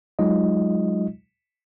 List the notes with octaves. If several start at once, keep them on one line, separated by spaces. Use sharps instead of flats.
F#3 G#3 D#4 F4 D#5